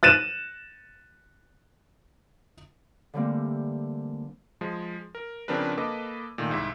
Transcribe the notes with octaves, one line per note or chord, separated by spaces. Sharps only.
F#6 A6 D#7 E7
D3 E3 G3 A3 A#3 C4
F3 G#3
A#4
C#3 F3 C4 D4 A#4 B4
A#3 A4 B4 D#5 D6
A#2 D#3 A3
C2 G#2 E4 E5